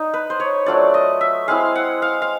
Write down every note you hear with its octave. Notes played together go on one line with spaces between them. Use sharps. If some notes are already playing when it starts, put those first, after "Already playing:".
Already playing: D#4
B4
C5
C#5
F#3 A3 D4 F4 D5
D#5
E5
G#3 C4 E4 F5
F#5
F5
F5